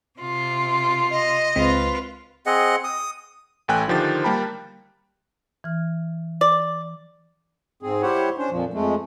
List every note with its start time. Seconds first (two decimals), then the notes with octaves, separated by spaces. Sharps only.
0.18 C3 F4
1.11 D#5
1.56 C#2 G#3 C4 F4 B4
2.46 C4 G#4 D#5 F#5
2.84 D#6
3.68 A1 A3 G5 G#5 F#6
3.88 D3 D#3 F3 G4 C5 A6
4.24 G3 A#3 G5 A5 B5
5.64 E3 F6
6.41 D5
7.83 G#2 C4 G#4
8.02 G3 E4 G4 C5 C#5 F#5
8.38 C#4 D4 C5
8.51 F2 A#2 F3
8.74 F2 G#3 A3